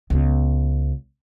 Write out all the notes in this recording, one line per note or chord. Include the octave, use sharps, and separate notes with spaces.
C#2 B3